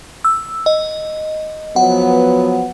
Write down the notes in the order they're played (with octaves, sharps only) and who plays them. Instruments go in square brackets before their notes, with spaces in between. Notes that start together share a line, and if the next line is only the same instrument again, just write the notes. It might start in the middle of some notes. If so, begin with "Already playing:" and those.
[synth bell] E6
D#5
[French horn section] F3 F#3 B3 [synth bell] F#5